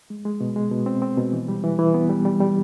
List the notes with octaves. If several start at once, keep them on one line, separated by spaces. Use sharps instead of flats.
G#3
G#3
B2
G#3
B2
C4
C4
B2
E3
G3
E3
E3
B3
G3
G3
G3